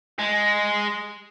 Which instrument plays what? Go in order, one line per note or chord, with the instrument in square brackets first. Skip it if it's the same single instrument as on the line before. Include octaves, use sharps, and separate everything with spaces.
[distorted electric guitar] G#3